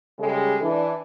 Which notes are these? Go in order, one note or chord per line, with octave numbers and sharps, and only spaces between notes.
C#3 G3 G#3 A4
E3 D4